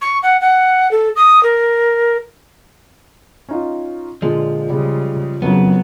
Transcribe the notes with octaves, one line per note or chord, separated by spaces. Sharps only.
C#6
F#5
F#5
A4
D#6
A#4
C#4 D#4 F4
A#2 D3 F3 G#3
C#3 G3 G#3
F#1 F2 C#3 F#3 B3